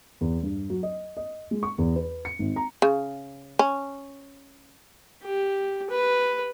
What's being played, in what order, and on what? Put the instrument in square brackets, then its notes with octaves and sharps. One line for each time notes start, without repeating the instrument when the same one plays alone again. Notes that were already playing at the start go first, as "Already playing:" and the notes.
[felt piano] E2
G2
F#3
D#5
D#5
G#3
C#6
E2
B4
C#7
G#1
A#5
[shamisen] C#3
C#4
[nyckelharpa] G4
B4